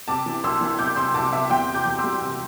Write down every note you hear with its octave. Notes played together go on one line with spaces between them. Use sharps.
C3 A5 D6
E3
C2 C6 E6
E3
C3 D6 G6
C3 C6 E6
C2 A5 D6
C3 E5 A5
E2 G5 C6
C3
D6 G6
E2
C6 E6
G3
C3